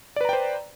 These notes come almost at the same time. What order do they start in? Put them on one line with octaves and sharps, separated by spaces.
D5 B4 A#5 G5 C5